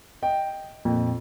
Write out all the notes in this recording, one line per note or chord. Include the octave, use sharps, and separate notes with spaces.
D#5 G5
F2 A#2